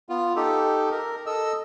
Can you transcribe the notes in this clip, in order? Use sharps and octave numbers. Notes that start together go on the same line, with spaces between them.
B3 F4
D#4 G4 A4
A#4
A4 D#5 E6